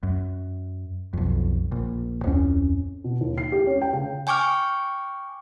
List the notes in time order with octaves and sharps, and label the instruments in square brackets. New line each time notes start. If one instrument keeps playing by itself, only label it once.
[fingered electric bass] F#2
B1 F2
A#1
D1 F2 C#4
[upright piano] B2
D#2
C7
G4
C#4
G5
C#3
[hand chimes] G5 G#5 C#6 D6 F6